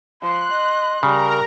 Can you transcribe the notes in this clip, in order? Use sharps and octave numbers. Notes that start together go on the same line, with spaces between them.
F3 C6 F#6
D#5
C#3 G3 A#4 A#5